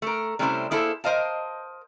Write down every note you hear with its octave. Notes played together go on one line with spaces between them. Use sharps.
A3 A#4
C3 G3 A3 C#4 E4 C5
A#3 E4 G#4 A4 C5
A#4 C5 D#5 F5 A5